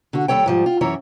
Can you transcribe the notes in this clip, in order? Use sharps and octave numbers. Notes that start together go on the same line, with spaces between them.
D3 F#4
D#2 G3 A4 C#5 G5
G#2 F3 G3
F4
F#2 E3 E4 C#5 A#5